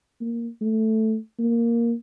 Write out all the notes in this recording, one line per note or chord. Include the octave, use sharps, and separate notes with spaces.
A#3
A3
A#3